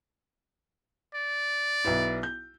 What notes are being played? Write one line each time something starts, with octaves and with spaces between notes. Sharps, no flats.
D5
B1 B3 E4
G6